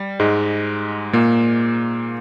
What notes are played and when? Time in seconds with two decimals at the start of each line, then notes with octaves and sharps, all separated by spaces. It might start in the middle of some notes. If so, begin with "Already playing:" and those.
Already playing: G3
0.20 G#2 G#3
1.13 A#2 A#3